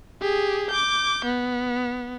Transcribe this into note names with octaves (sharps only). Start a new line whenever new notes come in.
G4 G#4
D6 G6
B3